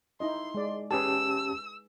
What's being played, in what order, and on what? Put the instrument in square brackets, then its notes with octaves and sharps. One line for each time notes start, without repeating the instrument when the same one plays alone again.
[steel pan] D#4 E4 D#5 [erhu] C6
[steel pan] G#3 D5
[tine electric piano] C#4 G4 A5 [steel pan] G#4 B4 [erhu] E6